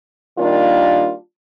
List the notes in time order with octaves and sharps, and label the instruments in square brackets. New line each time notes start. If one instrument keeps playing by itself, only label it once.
[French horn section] D#3 G3 A#3 D4 F4